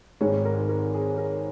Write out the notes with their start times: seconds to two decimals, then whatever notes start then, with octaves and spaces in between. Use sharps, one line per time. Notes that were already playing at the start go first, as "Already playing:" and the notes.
0.21 G#1 G#2 D#3 G#3 C#5
0.45 A#4
0.69 A#4
0.94 G#4
1.18 A#4